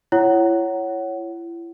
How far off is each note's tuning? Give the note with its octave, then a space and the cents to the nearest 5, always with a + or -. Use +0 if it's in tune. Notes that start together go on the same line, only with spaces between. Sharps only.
E4 +35 C#5 +0 F#5 +20